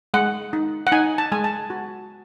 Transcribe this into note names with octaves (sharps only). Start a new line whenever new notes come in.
G#3 F#5
D#4
F#5
D#4 G#5
A5
G#3 G#5
A5
F#4